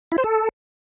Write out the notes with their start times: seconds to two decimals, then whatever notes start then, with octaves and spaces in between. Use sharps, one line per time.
0.12 E4
0.18 C5
0.24 A4